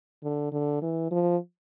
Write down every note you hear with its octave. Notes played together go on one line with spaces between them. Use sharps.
D3
D3
E3
F3